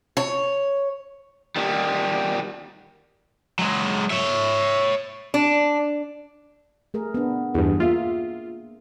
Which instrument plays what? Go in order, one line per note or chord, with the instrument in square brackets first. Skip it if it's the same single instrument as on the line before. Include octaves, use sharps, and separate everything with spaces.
[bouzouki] C#5
[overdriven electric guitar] D#3 G3
F#3 G#3
C#5 E5
[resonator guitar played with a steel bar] D4
[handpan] A3 G#4 A#4
B3 D4
[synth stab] E2 G2 [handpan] G#4
[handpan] A#3 E5 [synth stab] F4